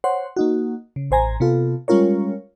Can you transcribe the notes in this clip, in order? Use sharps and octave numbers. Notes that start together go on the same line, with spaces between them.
C5 C#5 F#5 C6
A#3 D#4 F#4
C#3
A1 C5 G#5 A#5
C3 B3 F4 A4
G3 G#3 C#4 F4 A#4 C#5